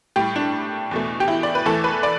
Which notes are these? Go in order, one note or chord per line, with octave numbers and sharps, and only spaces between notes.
A2 G3 G4
D4
E2 B2 A3
G4
E4
D5
B4
E2 E3 A3 A4
B4
D5